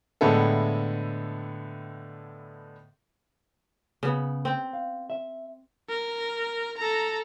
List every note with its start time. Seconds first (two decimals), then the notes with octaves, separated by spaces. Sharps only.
0.21 A2 D3 G#3 B3 E4 A4
4.03 C#3 B3
4.45 C4
4.73 F5
5.10 E5
5.90 A#4
6.78 A4 A#5